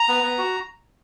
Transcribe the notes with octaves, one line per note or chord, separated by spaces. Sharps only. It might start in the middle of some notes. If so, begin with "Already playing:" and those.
Already playing: A#5
B3
B3
F#4